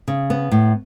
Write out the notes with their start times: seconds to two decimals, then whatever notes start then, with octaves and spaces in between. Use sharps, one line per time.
0.08 C#3
0.30 B3
0.51 A2